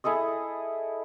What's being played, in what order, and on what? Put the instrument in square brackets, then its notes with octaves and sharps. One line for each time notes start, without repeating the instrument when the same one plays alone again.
[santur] E4 G#4 A4 D#5